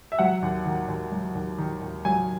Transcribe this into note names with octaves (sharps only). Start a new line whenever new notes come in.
E5
F#3 F#5
D#2
D#3
D#2
F#3
D#2
D#3
D#2
F#3 G#5